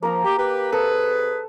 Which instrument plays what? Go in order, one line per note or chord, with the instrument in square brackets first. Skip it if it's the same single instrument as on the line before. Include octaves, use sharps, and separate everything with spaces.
[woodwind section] F3 [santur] A#3 A#4 A#5
[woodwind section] G4
G4 B4
[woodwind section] C3 G#4 B4 [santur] A4